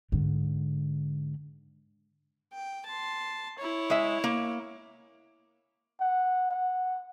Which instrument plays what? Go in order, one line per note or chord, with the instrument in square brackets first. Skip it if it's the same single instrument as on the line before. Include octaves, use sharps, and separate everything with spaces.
[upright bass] G#2 D3
[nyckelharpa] G5
A5 C6
E4 C#5
[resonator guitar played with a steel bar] G#3 E5
A#3
[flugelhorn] F#5
F#5